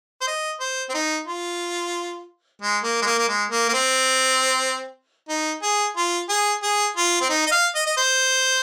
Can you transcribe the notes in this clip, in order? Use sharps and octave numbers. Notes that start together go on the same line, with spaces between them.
C5
D#5
C5
C4
D#4
F4
G#3
A#3
G#3
A#3
A#3
G#3
A#3
A#3
C4
D#4
G#4
F4
G#4
G#4
F4
C4
D#4
D#5
F5
D#5
D#5
C5